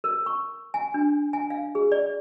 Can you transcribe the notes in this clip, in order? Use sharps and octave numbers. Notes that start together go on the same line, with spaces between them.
A#4
C#6
G#5
D4
G#5
F5
G#4
D5